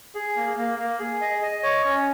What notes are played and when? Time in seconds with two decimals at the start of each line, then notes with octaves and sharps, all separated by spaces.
0.15 G#4
0.36 A#3
0.57 A#3
0.79 A#3
0.99 G#4
1.21 D#5
1.42 D#5
1.63 C#5
1.85 C#4